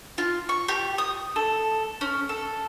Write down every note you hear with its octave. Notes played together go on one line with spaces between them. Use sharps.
F4
C#6
G4
D#6
A4
C#4
A4